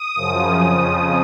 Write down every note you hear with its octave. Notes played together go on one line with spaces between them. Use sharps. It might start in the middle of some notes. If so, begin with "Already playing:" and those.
Already playing: D#6
F#2 C#3 F3
F2 C#3 F3